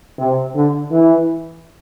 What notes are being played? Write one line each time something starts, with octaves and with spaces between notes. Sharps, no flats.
C3
D3
E3